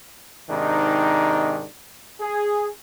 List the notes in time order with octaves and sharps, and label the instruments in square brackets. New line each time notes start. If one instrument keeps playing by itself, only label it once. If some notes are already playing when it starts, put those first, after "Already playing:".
[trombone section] G#2 C3 D#3 D4 D#4
G#4